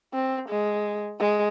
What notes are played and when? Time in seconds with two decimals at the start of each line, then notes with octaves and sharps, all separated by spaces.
0.13 C4
0.49 G#3
1.20 G#3